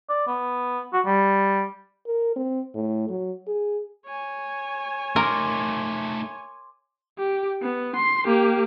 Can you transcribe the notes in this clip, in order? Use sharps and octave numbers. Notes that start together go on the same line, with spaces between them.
D5
B3
F#4
G3
A#4
C4
A2
F#3
G#4
C#5 G#5
A3 D#4 A#4 C6 D6
G4
B3
C6
A#3 G4